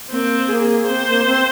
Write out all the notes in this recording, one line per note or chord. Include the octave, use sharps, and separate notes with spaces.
A#3 C4
A#3 G#4
C4 C5
A#3
C4